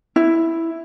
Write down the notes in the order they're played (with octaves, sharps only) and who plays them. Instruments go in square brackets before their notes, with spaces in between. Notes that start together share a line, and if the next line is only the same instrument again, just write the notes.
[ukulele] E4